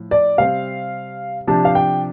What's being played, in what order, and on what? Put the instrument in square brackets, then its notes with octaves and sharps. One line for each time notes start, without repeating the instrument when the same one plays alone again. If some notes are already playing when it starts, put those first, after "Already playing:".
Already playing: [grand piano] A2 F3
[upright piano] D5
[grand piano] C3 G3 C4 [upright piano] F5
[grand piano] C3 F3 D4 G4 [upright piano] A5
[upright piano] F5
G5